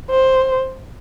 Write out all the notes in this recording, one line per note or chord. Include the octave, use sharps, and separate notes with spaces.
C5